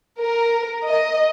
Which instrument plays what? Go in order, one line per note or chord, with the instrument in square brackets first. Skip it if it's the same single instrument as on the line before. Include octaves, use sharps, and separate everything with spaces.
[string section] A#4
D#5